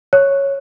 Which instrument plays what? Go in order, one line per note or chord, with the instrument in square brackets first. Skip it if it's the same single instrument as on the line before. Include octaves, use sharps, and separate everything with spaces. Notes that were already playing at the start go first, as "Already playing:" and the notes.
[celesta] C#5